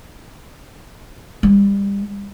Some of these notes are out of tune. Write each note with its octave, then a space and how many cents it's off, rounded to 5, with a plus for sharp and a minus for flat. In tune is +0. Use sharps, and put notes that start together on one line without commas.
G3 +30